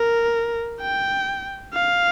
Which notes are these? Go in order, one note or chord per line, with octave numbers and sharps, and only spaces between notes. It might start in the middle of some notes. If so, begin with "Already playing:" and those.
Already playing: A#4
G5
F5